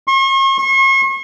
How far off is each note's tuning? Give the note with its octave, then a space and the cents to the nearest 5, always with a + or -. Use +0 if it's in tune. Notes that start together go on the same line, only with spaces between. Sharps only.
C#6 -45
C#6 -40